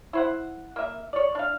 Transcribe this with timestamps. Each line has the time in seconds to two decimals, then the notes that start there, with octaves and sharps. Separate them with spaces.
0.13 E4 C5 F#5
0.76 A#3 E5
1.13 C#5 D5
1.35 D4 F5